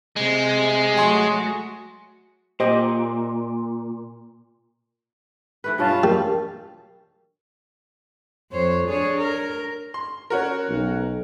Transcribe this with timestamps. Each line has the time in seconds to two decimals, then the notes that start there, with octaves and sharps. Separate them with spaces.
0.17 C3 G#3
0.97 F#3 A3 F#4 G#5 C6 D#6
2.60 A#2 G4 C5 D#5
5.64 E3 A3 B4
5.78 G2 B2 C#4 F4 A5
6.03 G3 A#4
8.52 F2 C5 C#5
8.88 D4 G#4 C#5
9.17 A#4
9.94 C6
10.30 C#4 F#4 A#4
10.69 B1